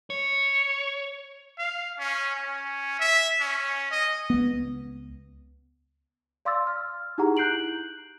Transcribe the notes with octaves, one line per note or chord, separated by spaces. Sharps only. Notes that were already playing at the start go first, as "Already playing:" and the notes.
C#5
F5
C#4
C#4
E5
C#4
D#5
C#2 B3
D5 F5 C6 D6 E6 A6
F6
D#4 E4 G4 G#4 F#5 A#5
F#6 G6 C7 D7 F#7